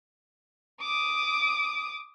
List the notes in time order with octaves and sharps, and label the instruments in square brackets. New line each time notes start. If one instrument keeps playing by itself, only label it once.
[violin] D6 D#6